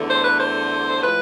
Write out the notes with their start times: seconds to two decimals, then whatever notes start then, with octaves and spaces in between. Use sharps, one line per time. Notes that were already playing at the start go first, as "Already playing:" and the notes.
Already playing: E2 D3 A3
0.09 C5
0.25 B4
0.39 C5
1.01 A2 F3 G#3 B4